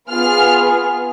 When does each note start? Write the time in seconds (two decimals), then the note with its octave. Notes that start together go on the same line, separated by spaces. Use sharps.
0.10 B3 F4 G#4 F6